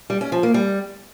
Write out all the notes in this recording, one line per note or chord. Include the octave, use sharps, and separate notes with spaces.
G3
C#4
F3
A#3
G3